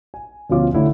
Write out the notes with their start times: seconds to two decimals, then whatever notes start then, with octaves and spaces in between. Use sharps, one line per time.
0.14 G#5
0.50 D2 B2 F3 C#4 F4 D6
0.74 D3 A3 C#4 E4